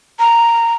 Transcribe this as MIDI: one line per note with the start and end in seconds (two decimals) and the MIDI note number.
0.19 0.74 82